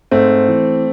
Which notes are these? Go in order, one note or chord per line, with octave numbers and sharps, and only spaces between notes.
G#2 A3 C4
E3